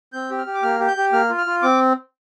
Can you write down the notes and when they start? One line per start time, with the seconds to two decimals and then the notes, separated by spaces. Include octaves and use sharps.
0.13 C4 G6
0.30 G4
0.38 F6
0.46 G4
0.54 D6
0.63 A#3 F6
0.80 G4
0.88 G6
0.97 G4
1.12 A#3 F6
1.30 F4
1.38 F6
1.46 F4
1.62 C4 D6